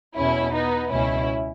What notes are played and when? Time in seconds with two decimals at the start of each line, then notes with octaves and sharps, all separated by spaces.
0.15 E2 B2 C#4 E4
0.53 B3 D#4
0.91 C#2 B2 C#4 E4